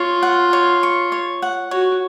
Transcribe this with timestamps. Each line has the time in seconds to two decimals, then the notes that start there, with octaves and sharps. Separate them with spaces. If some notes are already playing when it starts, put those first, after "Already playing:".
Already playing: F4 C#5
0.23 F#5
0.53 C#5
0.83 C#6
1.12 C#5
1.42 F#5
1.71 F#4 C#5